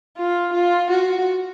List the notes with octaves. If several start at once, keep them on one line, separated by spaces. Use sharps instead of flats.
F4
F4
F#4